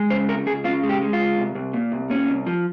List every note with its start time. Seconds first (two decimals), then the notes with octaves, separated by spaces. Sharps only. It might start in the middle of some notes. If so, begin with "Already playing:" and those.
Already playing: G#3
0.10 C#3 C5
0.28 C#2 A#4
0.46 C#2 G#4
0.64 C#3 F4
0.83 G#3
0.89 G4
1.01 G#3
1.13 F4
1.19 C#2
1.37 C2
1.55 C2
1.73 A#2
1.92 C2
2.10 A#2 C#4
2.28 C2
2.47 F3